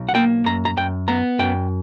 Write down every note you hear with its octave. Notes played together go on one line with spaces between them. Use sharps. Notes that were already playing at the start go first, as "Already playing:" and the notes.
Already playing: B1
F#5
A#3 G5
F#2 A#5
A#5
F#2 G5
B3 A#5
F#2 G5